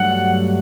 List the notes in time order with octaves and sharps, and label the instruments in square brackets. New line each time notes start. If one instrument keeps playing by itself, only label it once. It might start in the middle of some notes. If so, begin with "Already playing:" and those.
Already playing: [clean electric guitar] G2 F#3 A3 D4 F#5